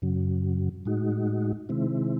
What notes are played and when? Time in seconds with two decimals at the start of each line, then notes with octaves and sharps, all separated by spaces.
0.02 F#2 C#3 F#3
0.86 A2 G#3 D#4 F#4
1.69 C3 D#3 G#3 C4 E4